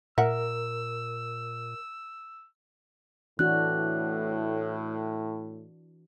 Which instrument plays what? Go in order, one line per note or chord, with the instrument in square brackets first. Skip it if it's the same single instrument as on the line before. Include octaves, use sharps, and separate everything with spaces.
[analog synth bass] A#2 [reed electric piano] A#4 [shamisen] E5 F#5 [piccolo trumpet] E6
[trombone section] A2 [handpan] E3 D4 F#4 [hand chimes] F#6